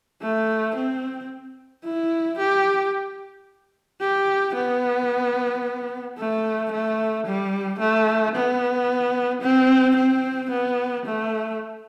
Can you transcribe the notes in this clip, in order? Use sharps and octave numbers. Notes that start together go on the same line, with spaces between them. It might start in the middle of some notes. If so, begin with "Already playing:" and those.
A3
C4
E4
G4
G4
B3
A3
A3
G3
A3
B3
C4
C4
B3
A3